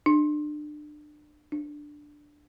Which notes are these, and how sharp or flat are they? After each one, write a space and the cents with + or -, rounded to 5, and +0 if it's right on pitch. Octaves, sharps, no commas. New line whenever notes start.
D4 +30
D4 +5